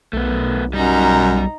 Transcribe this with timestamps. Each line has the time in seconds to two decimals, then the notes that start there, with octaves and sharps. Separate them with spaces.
0.13 B1 A3 B3
0.73 F#2 G3 D#4 A#5